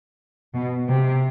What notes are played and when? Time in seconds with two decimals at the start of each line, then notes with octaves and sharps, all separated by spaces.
0.54 B2
0.89 C3